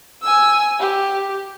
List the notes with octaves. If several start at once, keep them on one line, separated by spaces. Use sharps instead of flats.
G#5 E6
G4